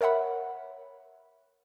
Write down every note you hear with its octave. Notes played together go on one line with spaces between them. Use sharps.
A#4 C#5 E5 F#5 B5